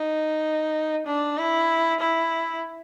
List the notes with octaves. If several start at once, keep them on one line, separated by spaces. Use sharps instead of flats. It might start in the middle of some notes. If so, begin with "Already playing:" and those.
Already playing: D#4
D4
E4
E4